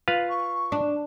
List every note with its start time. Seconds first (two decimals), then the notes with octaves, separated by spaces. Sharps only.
0.08 F4 B4 F5
0.30 C#6
0.72 D4